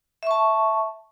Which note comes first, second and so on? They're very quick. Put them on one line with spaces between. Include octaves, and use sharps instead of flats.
E5 C#6 A5